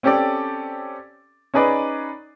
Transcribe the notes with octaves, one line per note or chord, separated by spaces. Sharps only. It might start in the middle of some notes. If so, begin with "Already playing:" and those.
C4 C#4 G4 A4 D5
C#4 D#4 G#4 B4 D5 D#5